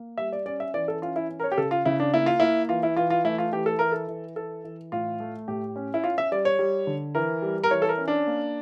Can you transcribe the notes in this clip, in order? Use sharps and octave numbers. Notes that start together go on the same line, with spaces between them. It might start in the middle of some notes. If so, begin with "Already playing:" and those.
Already playing: A#3
G3 E5
D5
C#4 D5
E5
E3 D5
A4
C#4 F4
E4
C#4
A#4
C#5
G4
C#3 A4
F4
C#3 E4
D4
A#3 E4
F4
A#3 E4
E3 F4
E4
E3 F4
F4
A3 E4
F4
E3 G4
A4
E3 A#4
A4
E3
E3 A4
E3
A2 F4
A3
A2 G4
C#4
E4
C#4 F4
E5
G3 D5
C#5
G3
D3
E3 A#4
G3
A#4
E3 C#5
A4
A#4
C#4
D4
A#3